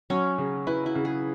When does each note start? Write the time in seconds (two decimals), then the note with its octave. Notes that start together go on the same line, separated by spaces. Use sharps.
0.10 F#3 C#4
0.38 C#3
0.67 E4 B4
0.86 E4
0.95 C#3
1.05 G#4